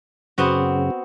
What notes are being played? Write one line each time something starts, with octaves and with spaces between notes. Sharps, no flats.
F#2 C#3 B3 C4 F#4